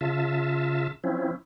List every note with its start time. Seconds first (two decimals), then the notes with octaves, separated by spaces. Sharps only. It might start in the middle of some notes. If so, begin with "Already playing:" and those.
0.01 C#3 F4 E5 A5
1.04 F3 C4 C#4 E4